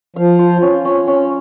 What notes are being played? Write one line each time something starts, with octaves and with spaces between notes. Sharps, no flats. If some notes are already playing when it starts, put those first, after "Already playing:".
F3 F5
F4
C#4
C#4
C#4